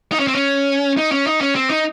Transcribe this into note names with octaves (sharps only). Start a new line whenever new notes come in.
D#4
C#4
C4
C#4
D#4
C#4
D#4
C#4
C4
D#4